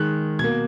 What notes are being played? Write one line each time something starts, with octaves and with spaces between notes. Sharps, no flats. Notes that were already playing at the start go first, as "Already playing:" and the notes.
Already playing: D#3 G#3 F#6
B2 A#3 G#6